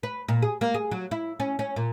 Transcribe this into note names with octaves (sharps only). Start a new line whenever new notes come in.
B4
A#2
G#4
A#3
G#4
F#3
E4
C#4
C#4
A#2